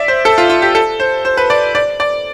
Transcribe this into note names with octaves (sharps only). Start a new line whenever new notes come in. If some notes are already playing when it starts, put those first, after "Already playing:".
Already playing: D5 E5
C5
A4
F4
F4
G4
A4
C5
C5
B4
D5
D5
D5